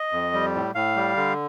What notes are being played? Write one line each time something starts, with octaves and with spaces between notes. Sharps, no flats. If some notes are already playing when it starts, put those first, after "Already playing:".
Already playing: D#5
F2
G3
A2
A2 F5
G3
D3